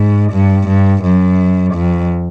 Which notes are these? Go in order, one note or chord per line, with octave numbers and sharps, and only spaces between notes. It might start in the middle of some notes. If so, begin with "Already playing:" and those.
Already playing: G#2
G2
G2
F#2
F2